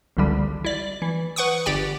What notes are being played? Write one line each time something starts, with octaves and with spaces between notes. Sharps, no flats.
G#1 C#2 D3 G3
E4 D5
E3
B4 F#5 C#6 D#6
G1 G4 D5 G5 D7